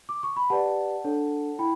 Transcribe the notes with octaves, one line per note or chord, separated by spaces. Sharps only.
D6
C#6
B5
G4 B4 D5 F#5 A5
D4 A4 C#5
E4 G5 B5